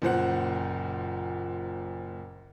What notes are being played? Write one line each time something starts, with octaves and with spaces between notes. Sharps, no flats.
F#1 A#2 C5 F#5